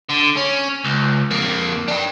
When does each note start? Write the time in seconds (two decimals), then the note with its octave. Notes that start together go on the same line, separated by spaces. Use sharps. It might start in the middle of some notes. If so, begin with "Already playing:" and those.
0.09 D3
0.36 C#4
0.84 C#2
1.31 F2 A#3
1.88 D4 G5